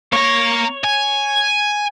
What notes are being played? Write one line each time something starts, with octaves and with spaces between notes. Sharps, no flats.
A#3 C#5 A#5
G#5